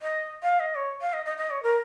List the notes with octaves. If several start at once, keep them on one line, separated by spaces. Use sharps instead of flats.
D#5
F5
D#5
C#5
F5
D#5
D#5
D#5
C#5
A#4